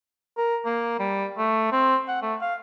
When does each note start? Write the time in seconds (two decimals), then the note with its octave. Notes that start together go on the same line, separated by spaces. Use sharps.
0.38 A#4
0.66 A#3
0.99 G3
1.38 A3
1.72 C4
2.08 F#5
2.22 A3
2.41 F5